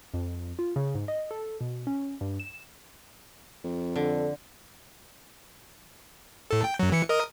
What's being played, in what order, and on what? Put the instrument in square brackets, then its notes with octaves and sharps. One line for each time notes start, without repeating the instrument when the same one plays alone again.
[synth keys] F2
F4
C#3
G#2
D#5
A4
B2
C#4
G2
E7
[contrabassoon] F2
[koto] D3 [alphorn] A4
[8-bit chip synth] A2 A4
G5
F#2 F#3
E3 C#7
A#4 D#5 D#6